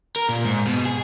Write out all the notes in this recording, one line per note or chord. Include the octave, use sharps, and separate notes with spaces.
A#4
A#2
G#2
B2
G#4